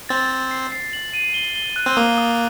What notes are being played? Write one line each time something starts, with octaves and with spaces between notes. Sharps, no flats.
C4 A6
A6
C7
C7
F#7
D#7
G7
G7
F#6
C4
A#3 D#6
D#6